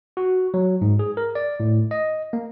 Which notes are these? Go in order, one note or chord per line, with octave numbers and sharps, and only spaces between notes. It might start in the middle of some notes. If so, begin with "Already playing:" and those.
F#4
F#3
G#2
G#4
A#4
D5
A2
D#5
A#3